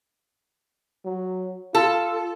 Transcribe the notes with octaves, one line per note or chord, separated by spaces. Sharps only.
F#3
F4 A4